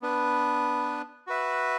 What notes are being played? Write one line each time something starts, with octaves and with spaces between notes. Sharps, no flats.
B3 D4 B4
F#4 B4 E5